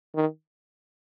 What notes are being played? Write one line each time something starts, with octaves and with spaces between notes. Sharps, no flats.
D#3